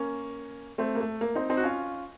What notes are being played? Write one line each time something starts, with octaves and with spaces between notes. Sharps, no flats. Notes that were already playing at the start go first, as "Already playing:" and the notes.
Already playing: A#3 C#4
A3 C4
A#3
A3
A#3
C4 D#4
C4 D#4
F#4
C#4 F4